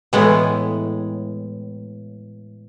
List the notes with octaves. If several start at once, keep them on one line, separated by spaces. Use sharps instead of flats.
A2 E3 G#3 B3